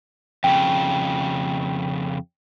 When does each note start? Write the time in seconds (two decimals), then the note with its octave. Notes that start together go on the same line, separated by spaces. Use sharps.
0.44 F2 C#3 G5